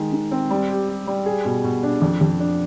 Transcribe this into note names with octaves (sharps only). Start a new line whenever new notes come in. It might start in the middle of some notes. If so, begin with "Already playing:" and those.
Already playing: D#3 G#3
D#3
C4
G3
G4
G4
G3
G#4
B2
B2
D4
F2
F2
D4